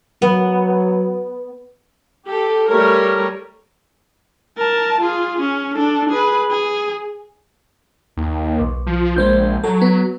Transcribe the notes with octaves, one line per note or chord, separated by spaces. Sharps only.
F#3 B3
G4 A4
G3 A3 A#4 C#5
A#4 A5
F4 G#4
C#4
D4 A4
G#4 B4
G#4
D#2
B1
F3
A#1 G#3 C5 G6
F#3 A4
B3